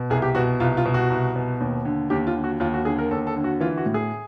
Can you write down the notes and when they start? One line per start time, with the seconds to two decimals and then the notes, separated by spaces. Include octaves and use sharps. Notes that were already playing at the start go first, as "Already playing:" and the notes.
Already playing: B2
0.10 C2 G#4
0.22 G4
0.35 B2 F#4
0.60 C2 F4
0.77 F4
0.85 B2
0.94 F#4
1.10 C2
1.36 B2
1.60 D#2
1.85 D3
2.10 D#2 G4
2.27 F4
2.35 D3
2.44 F#4
2.60 D#2 F4
2.74 F#4
2.85 D3 G#4
2.98 A#4
3.11 D#2 A4
3.27 A4
3.36 D3
3.44 F#4
3.60 E3 F4
3.77 F#4
3.86 A2
3.94 G#4